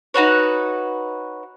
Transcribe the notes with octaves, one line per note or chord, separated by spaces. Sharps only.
D#4 F#4 B4 C#5